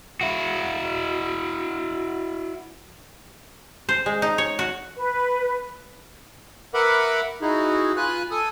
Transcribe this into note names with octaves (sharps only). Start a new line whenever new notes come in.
E4 F#4
C5
G#3
D#4
C#5
F#4
B4
A#4 B4 E5 F#5 B5 D6
D#4 E4 F#4 G#4
F4 B4 G#5 F#6
A4 G#5 D#6